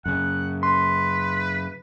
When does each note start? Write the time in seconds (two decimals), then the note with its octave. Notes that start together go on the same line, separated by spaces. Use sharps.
0.06 F#2 C#3 F#5
0.63 B4 C6